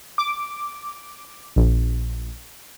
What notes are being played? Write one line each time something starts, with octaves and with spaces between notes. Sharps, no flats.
D6
A#1